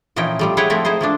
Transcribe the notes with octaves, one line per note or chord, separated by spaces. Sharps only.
A#2 E3 F3 C#4 D#4 G5
F3 G3 A3
E4 G#4 B4 C#5 F#5 G5
F3 A3 C4 E4 E5
D#4 E4 G#4 C5
F3 A3 D4